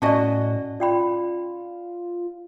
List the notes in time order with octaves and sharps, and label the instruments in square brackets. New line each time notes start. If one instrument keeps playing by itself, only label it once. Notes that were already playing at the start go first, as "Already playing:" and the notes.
[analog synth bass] A2 [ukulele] C#4 F#4 D#5 [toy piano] D5 A5
[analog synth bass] F4 [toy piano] D5 G5 B5